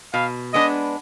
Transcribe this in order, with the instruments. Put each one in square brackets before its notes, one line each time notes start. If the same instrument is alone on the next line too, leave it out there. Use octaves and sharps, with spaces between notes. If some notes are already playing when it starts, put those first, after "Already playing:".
[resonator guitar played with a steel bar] B2 [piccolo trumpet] F5
[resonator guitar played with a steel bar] G#3 B3 D4 [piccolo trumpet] D#5